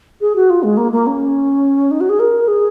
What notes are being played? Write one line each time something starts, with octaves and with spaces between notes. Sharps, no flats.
G#4
F#4
F4
G#3
A#3
A#3
C#4
D#4
F#4
G#4
A#4
G#4